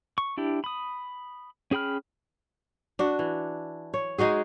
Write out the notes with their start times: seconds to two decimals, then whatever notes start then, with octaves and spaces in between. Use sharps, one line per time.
0.18 C#6
0.37 D4 E4 G4
0.64 B5 D#6
1.71 C#4 G#4 G5 B5 F6
2.99 D4 F#4
3.19 E3
3.94 C#5
4.18 G#3 D#4 F#4 G#4